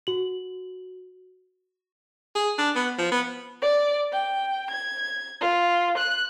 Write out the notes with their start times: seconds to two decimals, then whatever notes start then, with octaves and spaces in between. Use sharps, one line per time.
0.07 F#4 F#7
2.35 G#4
2.58 D4
2.75 B3
2.98 F3
3.12 B3
3.62 D5
4.12 G5
4.71 G#6
5.41 F4
5.98 F#6